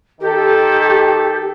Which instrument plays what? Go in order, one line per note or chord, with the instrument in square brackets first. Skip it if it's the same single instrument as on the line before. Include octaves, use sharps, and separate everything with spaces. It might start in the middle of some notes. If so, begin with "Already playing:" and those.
[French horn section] D#3 A4 [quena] G4